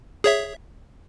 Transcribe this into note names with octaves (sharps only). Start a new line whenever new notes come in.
G#4 C#5 E5